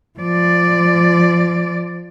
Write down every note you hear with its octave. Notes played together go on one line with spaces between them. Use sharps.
F3 D5